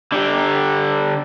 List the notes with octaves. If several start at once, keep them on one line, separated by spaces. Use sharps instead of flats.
D3 G4